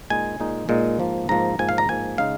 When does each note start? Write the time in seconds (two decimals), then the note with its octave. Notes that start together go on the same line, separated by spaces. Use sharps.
0.10 A#2 G#3 D#4 G#5
0.40 A#2 G#3 D#4
0.69 A#2 G#3 D#4
0.99 G#2 F3 A#3
1.29 G#2 F3 A#3 A#5
1.59 G#2 F3 A#3 G#5
1.69 F5
1.78 A#5
1.89 G#2 F3 A#3 G#5
2.18 C#3 G#3 D#4 F5